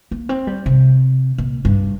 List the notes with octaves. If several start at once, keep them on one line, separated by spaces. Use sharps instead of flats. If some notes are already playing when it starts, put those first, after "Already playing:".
A#3
C4
G3
C3
A#2
G2